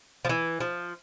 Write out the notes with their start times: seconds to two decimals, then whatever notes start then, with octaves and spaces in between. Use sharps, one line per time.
0.25 F3
0.29 E3
0.60 F3